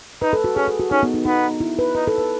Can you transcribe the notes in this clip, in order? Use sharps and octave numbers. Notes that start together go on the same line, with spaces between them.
D#4 B4
A4
F#4
C#4 G#4
A4
F#4
C#4 D#4
B3
D#4
B3 D#4
E4
B4
D#4 B4
A4
B4